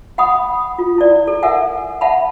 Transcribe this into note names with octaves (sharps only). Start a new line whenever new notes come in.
F#5 G5 B5 D#6
F4
E4 D5
A4
A4 A#4 E5 F#5 G#5
E5 F#5 A5 B5